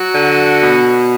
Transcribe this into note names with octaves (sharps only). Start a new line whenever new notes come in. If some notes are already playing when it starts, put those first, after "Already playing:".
Already playing: F#3 F#4
D3
B2